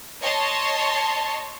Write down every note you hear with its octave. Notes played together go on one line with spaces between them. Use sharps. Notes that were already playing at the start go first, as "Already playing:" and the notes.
C#5 D#5 A5 C6